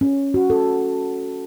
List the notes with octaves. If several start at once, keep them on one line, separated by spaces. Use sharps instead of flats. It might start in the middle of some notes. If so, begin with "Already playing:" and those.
C#4
F#4
A4